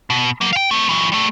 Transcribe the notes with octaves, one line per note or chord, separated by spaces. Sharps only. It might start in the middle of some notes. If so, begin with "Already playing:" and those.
B2
F#3 A#3
F5 G5
A3 C4
E3 F#3
G3 A3